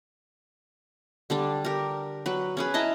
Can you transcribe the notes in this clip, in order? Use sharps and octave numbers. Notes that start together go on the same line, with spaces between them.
D3 G3 D4
G4 A#4
F#3 B4
C#4 G#4 B4
E4 D#5 A5 A#5